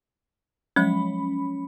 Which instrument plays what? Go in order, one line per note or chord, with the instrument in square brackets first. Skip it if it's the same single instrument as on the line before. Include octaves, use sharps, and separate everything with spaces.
[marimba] F3 F#3 G#3 [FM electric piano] C#4 B5